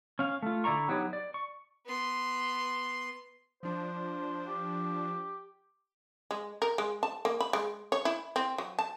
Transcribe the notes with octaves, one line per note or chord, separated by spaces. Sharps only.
C#4 F5
A3 F4
D3 E4 D5 A#5 C#6
F#3 B3 D#4 G4 C#5
D5
C#6
B3 C6
F3 D4 C5
G4
G#3
A#4
G#3
A5
A#3
B5
G#3
C#5
E4
C4
F#3
A5